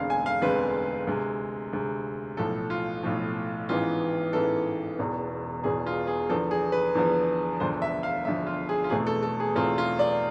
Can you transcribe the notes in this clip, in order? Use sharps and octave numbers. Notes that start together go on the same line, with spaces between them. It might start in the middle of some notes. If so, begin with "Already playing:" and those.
Already playing: E1 D2 D3 G#3 C4 F5
G#5
F5
E1 D2 D3 G#3 C4 B4
D2 C3 G#3
D2 C3 G#3
B1 A2 F3 A4
F4
B1 A2 F3
A1 G#2 E3 B3 F4
A1 G#2 E3 B3 A4
E1 E2 B2
E1 E2 B2 G#4
F4
G#4
E2 D3 F3 B3 A4
G#4
B4
E2 D3 F3 B3
E1 D2 D3 F3 C5
E5
F5
E1 D2 D3 F3 E5
F4
G#4
F4
E2 B2 A3 C4 G#4
A4
A4
G#4
E2 B2 A3 C4 F4
F4
D5